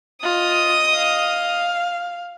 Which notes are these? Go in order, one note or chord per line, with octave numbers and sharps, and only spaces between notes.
F4 D#5 D#6
F5